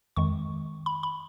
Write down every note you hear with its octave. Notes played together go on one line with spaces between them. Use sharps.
F2 D#3 G#3 C#6
B5
B5